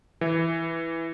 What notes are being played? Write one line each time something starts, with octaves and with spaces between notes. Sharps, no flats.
E3